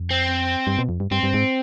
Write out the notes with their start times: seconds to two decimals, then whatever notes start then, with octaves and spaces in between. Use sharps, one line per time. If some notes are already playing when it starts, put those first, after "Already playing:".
Already playing: F2
0.11 C4
0.67 G2
0.78 B2
0.89 F2
1.00 G2
1.11 G2 C4
1.23 G2
1.34 G#2